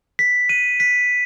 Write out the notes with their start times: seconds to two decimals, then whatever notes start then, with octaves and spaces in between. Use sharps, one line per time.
0.19 B6
0.49 D#7
0.80 B6